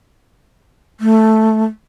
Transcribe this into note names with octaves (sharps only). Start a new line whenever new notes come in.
A3